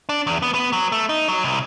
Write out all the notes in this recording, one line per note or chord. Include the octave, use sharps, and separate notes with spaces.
D4
E2
B3
B3
F#3
A3
D#4
F#3
C2